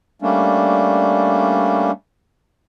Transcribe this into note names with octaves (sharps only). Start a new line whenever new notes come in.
G3 A3 A#3 C#4 D4